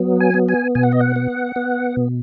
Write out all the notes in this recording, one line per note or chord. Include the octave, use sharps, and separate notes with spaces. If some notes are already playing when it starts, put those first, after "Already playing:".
Already playing: F#3 B3
G#5
B3
G#5
B2 G#5
F#5
D#5
F#5
B3
B3
B2